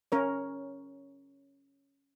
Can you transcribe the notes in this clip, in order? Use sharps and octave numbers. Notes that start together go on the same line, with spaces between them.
C#4 A#4 C#5